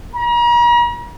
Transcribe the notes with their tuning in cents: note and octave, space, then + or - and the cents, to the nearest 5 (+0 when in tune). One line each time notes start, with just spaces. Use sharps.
A#5 +40